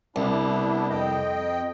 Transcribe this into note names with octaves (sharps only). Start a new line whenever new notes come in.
C2 B3 D4 E4
F2 D#5 G5